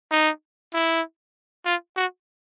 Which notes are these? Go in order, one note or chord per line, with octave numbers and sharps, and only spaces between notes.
D#4
E4
F4
F#4